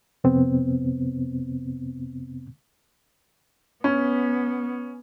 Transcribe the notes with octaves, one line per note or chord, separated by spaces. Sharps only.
F2 C3 B3 C4
B3 C#4